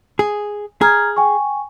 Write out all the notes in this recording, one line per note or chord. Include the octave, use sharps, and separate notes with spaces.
G#4
G#4 A#5 F6 G#6
G5 G#5 C#6